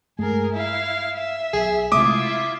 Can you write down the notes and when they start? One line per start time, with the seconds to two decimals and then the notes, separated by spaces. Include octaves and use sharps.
0.19 G2 G#3 A3 G#4 A#4
0.53 E4 F5
1.17 E5
1.53 B1 G#4
1.92 C3 G#3 A3 E4 F4 E5 D6 D#6